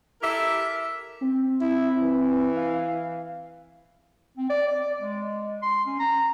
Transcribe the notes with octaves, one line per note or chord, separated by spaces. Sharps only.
E4 G4 A4 A#4 E5
C4
E4
E3
F5
C4
D5
D5
G#3
C6
C#4
A#5